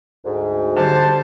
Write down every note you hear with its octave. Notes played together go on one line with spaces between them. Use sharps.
D2 G#2
D3 G3 C5 A5